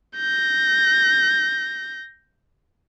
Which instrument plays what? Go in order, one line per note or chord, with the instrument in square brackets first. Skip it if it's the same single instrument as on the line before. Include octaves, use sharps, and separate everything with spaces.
[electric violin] G6 A#6